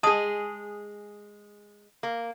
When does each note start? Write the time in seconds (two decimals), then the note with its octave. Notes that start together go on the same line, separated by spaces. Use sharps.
0.03 G#3 G#4 A5 D#6
2.03 A#3